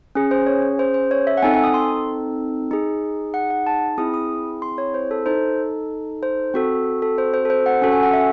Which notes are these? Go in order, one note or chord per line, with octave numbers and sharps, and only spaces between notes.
C#4 G#4
C5
C#5
C5
C5
C#5
E5
F#5
C4 D#4 A4 G#5
G#5
D#6
C6
D#4 G#4
F#5
F#5
A5
C4 E4 G#4 D#6
D#6
C6
C#5
C5
A4
D#4 A4 C5
C5
C4 F#4 A4
A4
C5
C5
A4
C5
F#5
C#4 F#4 A4
G#5
F#5
E5